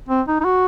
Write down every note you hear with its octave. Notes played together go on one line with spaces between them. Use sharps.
C4
D#4
D#4
F#4